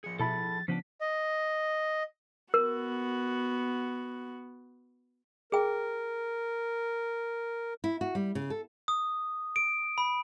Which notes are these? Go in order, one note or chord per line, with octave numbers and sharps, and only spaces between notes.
F3 G#4 C#7
B2 E4 A4 A5 B5 A6
C#3 F3 B3 D4 B6
D#5
B3 F#4 A#4
G#4 A#4 G5
E4
F#4
G3
C#3
A4
D#6
D7
B5